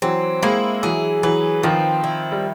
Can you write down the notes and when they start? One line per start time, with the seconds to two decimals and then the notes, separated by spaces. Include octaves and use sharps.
0.02 E3 F#3 C4
0.43 G#3 A#3 E4
0.83 E3 F#3 G#4
1.23 E3 F#3 B4
1.63 D#3 F3 C4
2.04 E4
2.32 G3